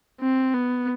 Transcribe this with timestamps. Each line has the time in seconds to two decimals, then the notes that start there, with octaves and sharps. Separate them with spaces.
0.21 C4
0.54 B3